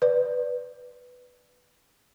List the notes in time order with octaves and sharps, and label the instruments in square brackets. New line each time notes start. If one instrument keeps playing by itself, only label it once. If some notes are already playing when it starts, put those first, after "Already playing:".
[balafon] B4 D5